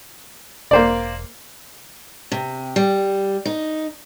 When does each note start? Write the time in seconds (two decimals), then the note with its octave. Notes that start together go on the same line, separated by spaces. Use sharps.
0.71 E1 A#3 C5 D5
2.32 C3
2.76 G3
3.45 D#4